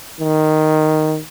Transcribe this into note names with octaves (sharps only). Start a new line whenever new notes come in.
D#3